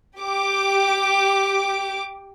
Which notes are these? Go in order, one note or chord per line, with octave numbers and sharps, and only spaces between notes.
G4 D6